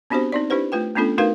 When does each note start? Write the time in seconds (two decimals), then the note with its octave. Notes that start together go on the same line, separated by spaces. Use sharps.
0.10 B3 C4 D4 F#4 G4 C5
0.32 C4 D#4 D5
0.50 D4 E4 G4 B4 C5
0.72 A3 F4 B4 G5
0.96 A3 B3 C#4 D4 F4 A4
1.18 A3 D#4 F#4 A#4 B4 F5